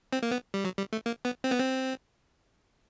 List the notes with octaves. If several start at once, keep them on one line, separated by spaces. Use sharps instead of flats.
C4
A#3
B3
G3
F#3
G3
A3
A#3
B3
C4
B3
C4